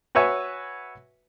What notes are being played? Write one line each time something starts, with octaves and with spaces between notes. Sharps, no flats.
F#4 B4 C#5 E5 G#5